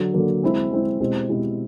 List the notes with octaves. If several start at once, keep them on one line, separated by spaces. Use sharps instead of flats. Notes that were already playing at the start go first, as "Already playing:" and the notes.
Already playing: D3 F#3
D3 F#3 A#3
G#3 C4 E4
G#3 C4 E4
B2 G#3 C4 E4 G4
B2 G#3 C4 E4 G4